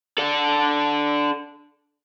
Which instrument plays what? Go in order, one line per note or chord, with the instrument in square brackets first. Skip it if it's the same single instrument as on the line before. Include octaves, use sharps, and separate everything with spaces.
[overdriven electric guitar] D4 A4